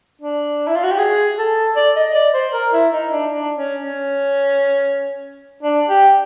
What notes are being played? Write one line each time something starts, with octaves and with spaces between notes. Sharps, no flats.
D4
E4
F4
F#4
G4
G#4
A4
D5
D#5
D5
C5
A#4
E4
D#4
D4
D4
C#4
C#4
D4
G4